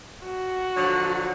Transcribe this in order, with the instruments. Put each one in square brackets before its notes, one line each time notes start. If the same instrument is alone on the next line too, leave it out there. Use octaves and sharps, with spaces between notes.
[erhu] F#4
[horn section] D3 F3 F#3